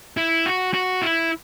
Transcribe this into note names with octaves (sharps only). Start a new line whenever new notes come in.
E4
F#4
F#4
E4